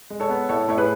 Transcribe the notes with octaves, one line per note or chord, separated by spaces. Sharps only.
G#3
A4 C#5
B3
A2 A4 C#5
A2 C#5
G#4 B4